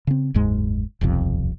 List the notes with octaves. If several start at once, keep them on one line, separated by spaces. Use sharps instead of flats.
C#3 C4
F#1 D#2 G#2 G#3
D#1 B1 F2 C3